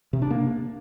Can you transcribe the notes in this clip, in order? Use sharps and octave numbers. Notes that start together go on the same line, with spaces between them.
C3
D4
A#3